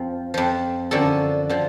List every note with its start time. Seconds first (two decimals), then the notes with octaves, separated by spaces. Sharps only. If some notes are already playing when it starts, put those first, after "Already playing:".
Already playing: F2 F3
0.34 F2 F3
0.91 F#2 D3 F3 A4
1.49 D3 F3